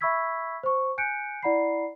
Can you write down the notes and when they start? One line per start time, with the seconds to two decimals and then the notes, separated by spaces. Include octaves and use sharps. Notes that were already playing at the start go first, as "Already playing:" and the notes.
0.01 E5 B5 C#6 E6 G#6 B6
0.63 C5 C#6
0.98 G#5 F#6 G6 C#7 D7
1.43 E4 D5 F#5 A#5 B5 C7